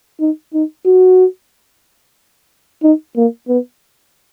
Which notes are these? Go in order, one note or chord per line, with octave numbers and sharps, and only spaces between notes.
D#4
D#4
F#4
D#4
A#3
B3